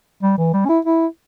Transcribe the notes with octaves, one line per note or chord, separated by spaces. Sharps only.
G3
E3
G3
C#4
E4
E4